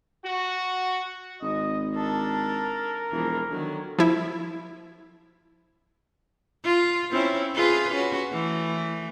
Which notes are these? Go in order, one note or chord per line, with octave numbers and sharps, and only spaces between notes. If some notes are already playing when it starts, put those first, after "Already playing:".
F#4
G#1 D#5
D4 A4 A#4
E1 E3 F3
D3 D#3 F#3
F3 E4
F4
C4 C#4 E4
F4 G#4 B4
C#4 F#4
E3 A3